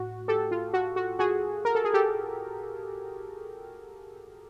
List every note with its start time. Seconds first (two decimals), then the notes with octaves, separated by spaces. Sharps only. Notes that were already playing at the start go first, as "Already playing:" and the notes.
Already playing: A2 F#4
0.28 G4 A4
0.51 F4
0.74 F#4
0.96 F#4
1.19 F#4 G#4
1.65 A#4
1.75 A4
1.84 G#4
1.94 G4 A4